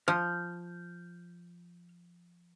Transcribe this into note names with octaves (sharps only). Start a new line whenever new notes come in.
F3 F6 G6